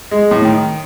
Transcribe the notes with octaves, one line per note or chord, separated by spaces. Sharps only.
G#3
A2
D#3